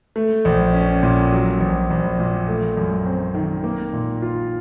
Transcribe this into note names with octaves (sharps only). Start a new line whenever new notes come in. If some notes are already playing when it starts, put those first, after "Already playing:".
A3
A#1
C#4
A#2
F#3
A#1
A#1
A#2
A3
F#2
C4
D#3
A#3
A#2
F4